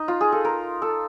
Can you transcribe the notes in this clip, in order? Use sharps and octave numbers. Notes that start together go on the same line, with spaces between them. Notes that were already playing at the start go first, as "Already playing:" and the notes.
Already playing: D#4
F4
G#4
A4
A#4
A4